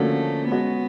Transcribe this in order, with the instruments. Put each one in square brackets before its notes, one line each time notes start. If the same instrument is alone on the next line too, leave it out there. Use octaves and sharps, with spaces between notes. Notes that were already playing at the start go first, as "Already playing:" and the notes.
Already playing: [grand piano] D3 F3 A#3 C#4 F#4 [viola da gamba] A3
[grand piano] G#3 C#4 F#4 [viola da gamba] B3